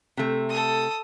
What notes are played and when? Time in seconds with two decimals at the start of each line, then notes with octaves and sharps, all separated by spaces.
0.17 C3 A3
0.49 A4 D#6